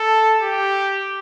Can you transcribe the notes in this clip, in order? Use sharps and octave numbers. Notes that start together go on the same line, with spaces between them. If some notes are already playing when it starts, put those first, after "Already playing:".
Already playing: A4
G4